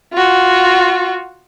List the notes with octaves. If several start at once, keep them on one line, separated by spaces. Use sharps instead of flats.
F4 F#4